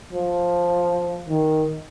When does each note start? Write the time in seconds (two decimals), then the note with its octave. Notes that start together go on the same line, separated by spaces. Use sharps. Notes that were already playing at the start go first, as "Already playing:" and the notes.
0.13 F3
1.29 D#3